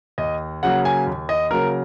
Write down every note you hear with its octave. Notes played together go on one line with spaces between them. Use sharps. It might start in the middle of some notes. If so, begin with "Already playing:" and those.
D#2 D#5
C#3 F#3 A#3 F#5
G#5
D#2
D#5
C#3 F#3 A#3 A#4